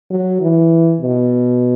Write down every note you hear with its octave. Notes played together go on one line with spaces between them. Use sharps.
F#3
E3
B2